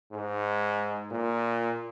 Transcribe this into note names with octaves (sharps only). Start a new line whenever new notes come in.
G#2
A#2